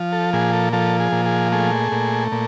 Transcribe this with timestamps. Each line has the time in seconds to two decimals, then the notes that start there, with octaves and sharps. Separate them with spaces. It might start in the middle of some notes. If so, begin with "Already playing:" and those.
Already playing: F3
0.12 A4
0.33 A#2 G#4
0.53 A4
0.73 F3 A4
1.00 G#4
1.12 A#2
1.26 G#4
1.52 A3 G#4
1.92 A#2
2.32 A#2